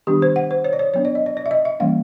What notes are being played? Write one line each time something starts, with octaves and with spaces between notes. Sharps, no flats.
D#3 G3 B3 D4 G4
C5
F#5
C5
C#5
D5
C#5
F#3 B3 D4 C#5
D5
D#5
D5
D5
E5
D#5
E5
E3 G3 A#3 C#4 F5